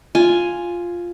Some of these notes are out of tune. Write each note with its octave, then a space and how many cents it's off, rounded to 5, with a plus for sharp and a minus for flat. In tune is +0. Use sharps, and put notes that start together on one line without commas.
F4 +0 G#5 +0